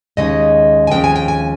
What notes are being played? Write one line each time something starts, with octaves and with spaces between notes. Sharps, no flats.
D#2 C#3 G#3 D#4 D#5
G#5
D#2 C#3 F3 G#3 C4 G5
G#5
G5
G#5